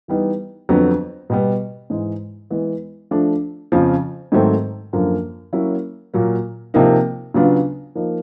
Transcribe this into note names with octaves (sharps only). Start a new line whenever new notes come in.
E3 G3 B3 D#4
F2 D3 F#3 B3
B2 G3 B3
G#2 E3 G#3
E3 G#3 B3
F3 A3 D4
F2 C#3 F3
G#2 D#3 F#3 A3 C4
F#2 D3 F3 A#3
F#3 A#3 C#4 E4
A#2 F#3 A#3
C3 F3 A#3 D#4
C#3 F#3 B3 D4 F4
F3 A#3 D#4